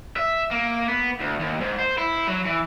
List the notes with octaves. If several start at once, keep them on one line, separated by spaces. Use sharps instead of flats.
E5
A#3
B3
D2
D#2
G#2
C5
E4
F#3
E3